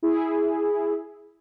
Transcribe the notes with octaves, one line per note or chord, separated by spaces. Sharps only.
E4 G#4